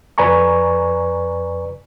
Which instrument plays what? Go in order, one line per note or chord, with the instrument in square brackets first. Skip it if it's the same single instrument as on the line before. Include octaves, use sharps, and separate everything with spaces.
[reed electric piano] F2 B4 D5 G#5 A#5 C#6